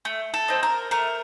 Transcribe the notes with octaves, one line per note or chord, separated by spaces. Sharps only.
A3
A4
C4 D#4
A#4
A3 A#4